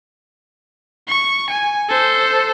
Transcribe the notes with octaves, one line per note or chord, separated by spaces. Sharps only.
C#6
G#5
A4 C5